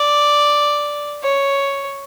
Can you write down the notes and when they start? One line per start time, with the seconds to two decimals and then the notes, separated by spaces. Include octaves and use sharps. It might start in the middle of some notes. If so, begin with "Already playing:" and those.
Already playing: D5
1.22 C#5